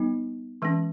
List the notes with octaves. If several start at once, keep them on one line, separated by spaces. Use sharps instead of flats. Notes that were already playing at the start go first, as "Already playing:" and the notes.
Already playing: G3 B3 D#4
E3 G#3 C#4